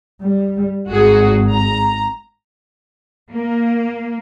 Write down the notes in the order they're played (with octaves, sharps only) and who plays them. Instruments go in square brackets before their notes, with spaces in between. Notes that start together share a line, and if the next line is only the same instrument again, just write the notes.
[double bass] G3
[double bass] G#1 [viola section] F#4 G#4
[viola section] A#5
[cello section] A#3